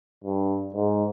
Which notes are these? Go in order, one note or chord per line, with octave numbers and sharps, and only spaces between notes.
G2
G#2